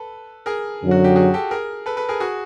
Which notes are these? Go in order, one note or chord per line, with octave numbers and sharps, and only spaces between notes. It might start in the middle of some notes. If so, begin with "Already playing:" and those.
Already playing: A4 B4
G#4 A#4
F#2 D3 F#3
F#4
G4
F#4 G#4
G4 A4
G#4 A#4
A4 B4
A4 B4
G#4 A#4
F#4 G#4